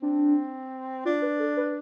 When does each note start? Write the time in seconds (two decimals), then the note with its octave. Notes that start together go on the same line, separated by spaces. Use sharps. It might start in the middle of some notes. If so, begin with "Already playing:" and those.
0.02 C4 D4
1.05 D4 F4
1.22 B4
1.39 A4
1.57 B4